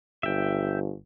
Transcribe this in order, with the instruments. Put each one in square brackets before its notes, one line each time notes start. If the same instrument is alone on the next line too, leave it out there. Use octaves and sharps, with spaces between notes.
[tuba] G1 [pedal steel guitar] E5 G5